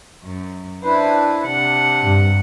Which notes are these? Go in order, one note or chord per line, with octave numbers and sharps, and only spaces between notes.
F#2
D4 E4 B4 C5
C3 D4 F#5
G2